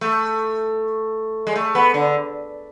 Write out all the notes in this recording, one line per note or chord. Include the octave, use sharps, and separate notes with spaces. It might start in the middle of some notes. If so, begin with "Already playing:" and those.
A3
G#3
A3
B3
D3